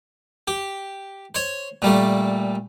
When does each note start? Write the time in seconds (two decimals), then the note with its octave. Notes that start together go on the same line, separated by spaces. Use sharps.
0.48 G4
1.35 C5 C#5
1.82 A#2 G3 A3